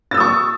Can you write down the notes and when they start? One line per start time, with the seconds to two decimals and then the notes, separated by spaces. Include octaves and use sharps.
0.11 A6
0.14 E6
0.17 D#6
0.20 C#6